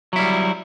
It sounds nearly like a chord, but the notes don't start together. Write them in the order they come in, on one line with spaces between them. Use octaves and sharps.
F#3 E4 G3